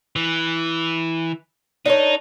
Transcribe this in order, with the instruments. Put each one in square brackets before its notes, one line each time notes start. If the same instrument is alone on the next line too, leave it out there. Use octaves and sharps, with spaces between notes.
[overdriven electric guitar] E3
[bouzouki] D4 A#4 C#5 [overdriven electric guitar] D#4